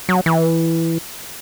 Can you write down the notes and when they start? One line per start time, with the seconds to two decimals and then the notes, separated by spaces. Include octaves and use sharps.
0.09 F#3
0.26 E3